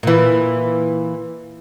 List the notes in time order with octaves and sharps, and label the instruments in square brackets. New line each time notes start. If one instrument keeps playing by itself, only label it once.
[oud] A#2 E3